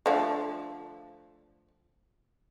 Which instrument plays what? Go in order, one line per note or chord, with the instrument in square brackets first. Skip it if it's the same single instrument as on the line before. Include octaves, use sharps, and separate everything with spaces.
[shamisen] D3 F3 A3